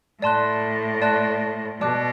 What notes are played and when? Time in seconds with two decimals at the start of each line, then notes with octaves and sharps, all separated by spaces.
0.22 A2 D5 A5 C6 F#6
1.02 D5 A5 C6 F#6
1.81 B2 D5 A5 D6 F#6